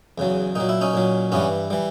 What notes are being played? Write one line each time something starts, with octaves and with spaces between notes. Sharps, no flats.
E2 C#3 F#3
A#2 F#3 D#4
E4
C#4 D#4
A#2 F#3
G2 E3 G3 B3 C#4
E3 G3